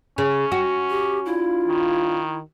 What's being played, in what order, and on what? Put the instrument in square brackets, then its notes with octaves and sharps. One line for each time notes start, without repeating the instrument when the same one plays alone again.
[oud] C#3 [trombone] C#4
[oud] F#4
[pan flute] G4
[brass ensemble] D4 F4 [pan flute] E4
[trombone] D#3